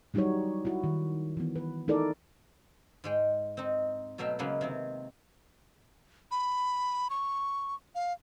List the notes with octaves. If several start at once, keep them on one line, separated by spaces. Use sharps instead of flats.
F#3 G3 D#4 E4 F#4 C#5
E4 F#4
D#3
E3 B3
B4
D#4 E4 A4 A#4 D5
G#2 G#3 G5
C4 D#4
B2 F#3 A3 E5 F5 G5
C#3 F#3 G#3 A#3 B3
C3 D#3 C4
B5
C#6
F5